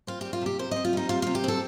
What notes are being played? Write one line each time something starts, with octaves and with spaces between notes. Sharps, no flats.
C4 F4
G3 G4
F4
C3 G4
C3 C5
C4 D#5
F4
G3 D#4
C3 F4
C3 F4
G4
C4 A4